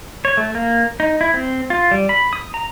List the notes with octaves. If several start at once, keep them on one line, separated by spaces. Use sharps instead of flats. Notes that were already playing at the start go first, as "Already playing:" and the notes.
C#5
A3
A#3
D#4
E4
C4
F4
G3
B5
D#6
A#5